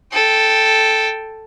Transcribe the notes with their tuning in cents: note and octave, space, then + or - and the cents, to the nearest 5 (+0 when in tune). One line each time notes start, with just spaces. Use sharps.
A4 +0 G5 +0